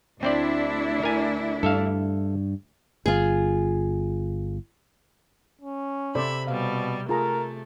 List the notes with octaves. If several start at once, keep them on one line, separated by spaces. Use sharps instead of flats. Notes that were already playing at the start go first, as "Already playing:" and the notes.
D2 C4 D4 E4 C5 D5
A#4 G#5
G2 A4 E5 F5
G1 F4 G#4
C#4
C3 A4 C5 D5 E5 B5
B2 G3 C4 F5
A3 F4 G#4 A#4 A#5